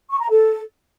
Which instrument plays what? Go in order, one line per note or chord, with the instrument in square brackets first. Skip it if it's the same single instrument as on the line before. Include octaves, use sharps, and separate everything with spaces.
[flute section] C#6
A#5
A4